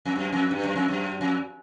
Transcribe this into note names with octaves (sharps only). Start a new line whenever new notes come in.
F2
F#2
F2
G2
F#2
F2
F#2
F2